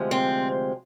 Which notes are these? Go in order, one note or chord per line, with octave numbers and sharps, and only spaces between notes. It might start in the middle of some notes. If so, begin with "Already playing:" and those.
Already playing: D2 C3 F3 G#3
C4